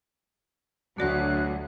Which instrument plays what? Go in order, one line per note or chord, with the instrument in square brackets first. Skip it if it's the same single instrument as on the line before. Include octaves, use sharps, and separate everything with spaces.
[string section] D2 [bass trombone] F#3 [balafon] F#4 D5 F#5 [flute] F#6